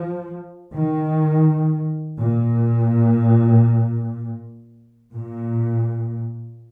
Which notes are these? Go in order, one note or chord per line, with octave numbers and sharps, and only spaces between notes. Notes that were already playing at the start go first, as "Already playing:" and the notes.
Already playing: F3
D#3
A#2
A#2